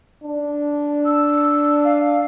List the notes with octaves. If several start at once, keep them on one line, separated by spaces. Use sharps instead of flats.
D4
E6
F5